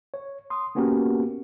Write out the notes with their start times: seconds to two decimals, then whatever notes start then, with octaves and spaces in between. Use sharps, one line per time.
0.14 C#5
0.50 C6 D#6
0.75 A#3 B3 C#4 F#4 G4 A#4